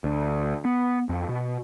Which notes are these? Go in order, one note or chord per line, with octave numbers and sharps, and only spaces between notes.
D2
B3
F2
B2